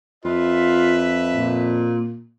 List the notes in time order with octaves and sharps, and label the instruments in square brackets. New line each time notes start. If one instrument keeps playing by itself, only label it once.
[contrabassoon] F2 [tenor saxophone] F4 [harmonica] B4 E5
[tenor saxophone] A#2